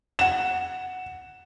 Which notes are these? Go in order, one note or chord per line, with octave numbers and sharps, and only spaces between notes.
F#5 E7